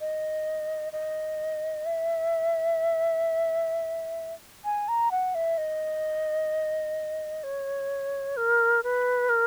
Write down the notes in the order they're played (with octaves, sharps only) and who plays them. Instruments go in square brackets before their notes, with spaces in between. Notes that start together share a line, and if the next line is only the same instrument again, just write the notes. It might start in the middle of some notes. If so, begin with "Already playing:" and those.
[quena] D#5
D#5
E5
G#5
A#5
F#5
E5
D#5
C#5
A#4
B4
A#4